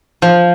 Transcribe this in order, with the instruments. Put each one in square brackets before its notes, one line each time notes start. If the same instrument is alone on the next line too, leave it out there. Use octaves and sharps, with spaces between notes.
[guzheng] F3